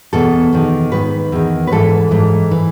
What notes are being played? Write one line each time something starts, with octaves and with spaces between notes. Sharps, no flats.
E2 B2 A4
E2 D#3
G#2 D#3 B4
E2 D#3
B4
G#2 E3 A4
G#2 E3
E3